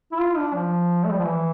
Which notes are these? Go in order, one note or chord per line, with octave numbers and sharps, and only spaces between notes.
E4
F4
D4
F3
A3
G3
F3
E3